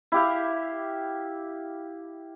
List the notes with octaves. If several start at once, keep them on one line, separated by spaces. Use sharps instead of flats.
E4 G4 F5